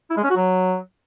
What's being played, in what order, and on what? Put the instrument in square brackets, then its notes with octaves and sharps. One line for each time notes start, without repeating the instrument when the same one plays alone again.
[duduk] E4
G#3
C#4
F#4
F#3